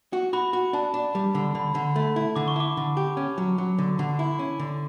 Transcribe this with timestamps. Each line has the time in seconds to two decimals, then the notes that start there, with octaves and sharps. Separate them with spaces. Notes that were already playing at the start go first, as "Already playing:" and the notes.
0.13 F#4
0.33 F#4 B5
0.53 F#4
0.73 D4 A5
0.94 D4
1.15 G3
1.35 D3
1.55 D3 B5
1.75 D3
1.96 A3
2.16 E4
2.36 D3 D6
2.48 C#6
2.56 E4 D6
2.77 D3
2.97 G4
3.17 C#4
3.38 F#3
3.58 F#3
3.78 D3
3.99 D3
4.19 E4
4.39 C#4
4.59 D3